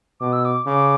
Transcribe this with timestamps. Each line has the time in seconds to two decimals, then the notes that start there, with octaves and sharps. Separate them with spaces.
0.20 B2 D6
0.33 E6
0.45 D6
0.66 C#3 D6